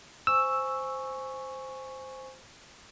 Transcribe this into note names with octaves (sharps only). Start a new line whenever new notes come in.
C5 G#5 C#6 E6